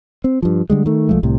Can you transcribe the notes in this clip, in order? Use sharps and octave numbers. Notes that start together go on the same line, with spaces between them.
C4
G2 F3
D3 G3 G#3
D#3 A3
C2 F3 G#3 A3
C2 A2 C3